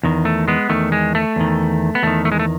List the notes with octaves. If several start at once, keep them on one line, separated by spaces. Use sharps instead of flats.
E2 D#3
A3
G#3 B3
E2 D#3 A3
G#3
A3
E2 D#3
B3
E2 D#3 A3
A3
G#3
A3